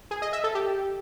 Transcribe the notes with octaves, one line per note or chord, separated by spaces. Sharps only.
G#4
D#5
E5
A4
G4